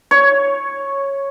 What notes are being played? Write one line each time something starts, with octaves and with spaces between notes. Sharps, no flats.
C#5